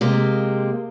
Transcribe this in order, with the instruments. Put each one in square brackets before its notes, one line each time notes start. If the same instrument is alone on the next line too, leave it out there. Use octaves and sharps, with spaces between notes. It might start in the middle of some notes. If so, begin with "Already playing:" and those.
[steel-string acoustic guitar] C3 G#3 A#3 C4